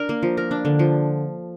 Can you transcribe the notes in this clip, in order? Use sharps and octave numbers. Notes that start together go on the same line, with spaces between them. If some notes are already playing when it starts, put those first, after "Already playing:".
Already playing: D4 A#4
A#3
F3
A#4
D4
D3
F3